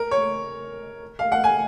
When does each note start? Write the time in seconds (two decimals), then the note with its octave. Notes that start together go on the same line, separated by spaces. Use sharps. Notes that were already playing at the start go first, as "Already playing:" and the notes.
Already playing: A#4
0.11 C#5
1.19 F5
1.32 F#5
1.44 G#5